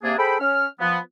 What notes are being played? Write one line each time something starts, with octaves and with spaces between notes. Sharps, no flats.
C3 A#3 D4 G#4
G#4 A4 C5 G5 B5
C#4 F6
F3 B3